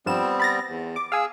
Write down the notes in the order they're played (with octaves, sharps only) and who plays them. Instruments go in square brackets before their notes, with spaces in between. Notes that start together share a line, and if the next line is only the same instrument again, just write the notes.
[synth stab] G2 F3 E7 [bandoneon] G3 B3 C4
[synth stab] B5 A6 A#6
[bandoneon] E2
[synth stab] D6
[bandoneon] G#4 E6 [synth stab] F5 G#5